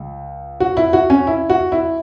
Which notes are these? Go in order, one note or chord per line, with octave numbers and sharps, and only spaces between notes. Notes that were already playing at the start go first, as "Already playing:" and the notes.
Already playing: C#2
F#4
E4
F#4
C#4
E4
F#4
E4